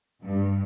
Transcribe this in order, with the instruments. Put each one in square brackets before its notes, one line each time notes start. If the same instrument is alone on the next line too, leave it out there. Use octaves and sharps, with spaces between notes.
[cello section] G2